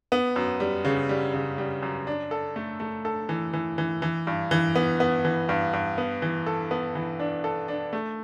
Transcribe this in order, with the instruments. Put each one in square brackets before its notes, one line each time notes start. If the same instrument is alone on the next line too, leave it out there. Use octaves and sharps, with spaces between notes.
[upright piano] B3
F#2
G3
C#3
G3
C#3
G3
F#2
D4
A4
A3
A3
A4
E3
E3
E3
E3
G2
E3
B3
B3
E3
G2
G2
B3
E3
A4
B3
E3
D4
A4
D4
A3